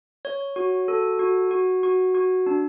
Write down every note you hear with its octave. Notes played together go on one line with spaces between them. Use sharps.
C#5
F#4
A4
F#4
F#4
F#4
F#4
D4